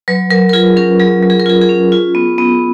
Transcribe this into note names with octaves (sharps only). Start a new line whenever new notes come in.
F#3 B4
F#3 A#4
A#4
F4 G#4
C#4 A#4
F#3 G#4
F#3
G#4
A#4
F4 G#4
G#4
C#4
F4
B3
B3